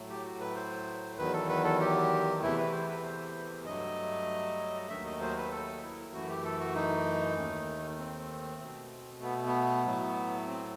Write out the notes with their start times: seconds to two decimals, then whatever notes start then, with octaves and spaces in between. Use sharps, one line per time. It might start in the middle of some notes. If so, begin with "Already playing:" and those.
Already playing: A2 F#3 A3
0.10 G4
0.25 F#4
0.40 B4
0.55 C5
1.18 E2 D#3 F#3 B4
1.33 A4
1.48 B4
1.64 A4
1.80 G4
2.41 E2 C3 E3 A3 E4
2.58 B4
2.72 C5
2.88 B4
3.04 C5
3.65 G2 F#3 A3 D#5
4.89 D#2 D#3 F#3 A3 E5
5.05 D#5
5.21 C5
5.37 B4
5.51 A4
5.83 E4
6.14 F#2 E3 A3 F#4
6.29 G4
6.44 A4
6.60 F#4
6.75 D#4
7.37 D#2 D#3 A3
7.99 C4
8.61 B2 A3
9.23 B3
9.46 B3
9.85 A2 F#3 A3
10.47 C4